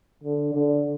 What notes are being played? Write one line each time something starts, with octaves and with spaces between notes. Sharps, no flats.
D3
D3